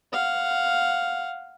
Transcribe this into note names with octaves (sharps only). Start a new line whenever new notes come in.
F5 F#5